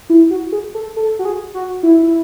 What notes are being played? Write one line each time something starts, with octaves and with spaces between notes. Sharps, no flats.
E4
F#4
G#4
A4
A4
F#4
G#4
F#4
E4
E4